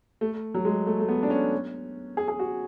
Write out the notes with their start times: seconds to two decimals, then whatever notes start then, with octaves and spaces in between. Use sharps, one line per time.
0.21 A3
0.54 F#3
0.65 G#3
0.87 A3
1.00 A3
1.09 B3
1.23 D4
1.30 C#4
2.17 G#4
2.28 G#4
2.39 F#4